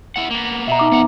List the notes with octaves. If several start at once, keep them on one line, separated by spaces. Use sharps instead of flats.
E4 F#5
A#3 B3
B2 E5 A#5
D#4 D6
F2 B3 F#5